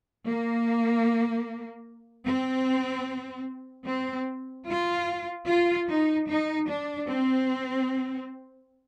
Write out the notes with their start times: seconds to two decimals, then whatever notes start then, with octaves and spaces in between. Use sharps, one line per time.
0.27 A#3
2.27 C4
3.87 C4
4.68 F4
5.47 F4
5.88 D#4
6.28 D#4
6.67 D4
7.08 C4